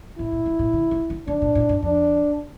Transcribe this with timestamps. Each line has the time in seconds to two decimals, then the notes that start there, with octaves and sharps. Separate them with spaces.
0.18 A2 E4
0.32 A#2
0.46 C3
0.59 A#2
0.73 D3
0.91 C3
1.10 D3
1.27 D3 D4
1.42 A#2
1.55 A2
1.69 G2
1.82 F2 D4